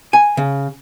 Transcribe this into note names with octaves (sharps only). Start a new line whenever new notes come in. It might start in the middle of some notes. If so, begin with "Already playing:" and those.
G#5
C#3